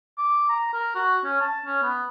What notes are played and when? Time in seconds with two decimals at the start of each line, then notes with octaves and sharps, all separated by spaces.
0.18 D6
0.49 A#5
0.73 A#4
0.96 F#4
1.24 C#4
1.41 A5
1.66 C#4
1.82 B3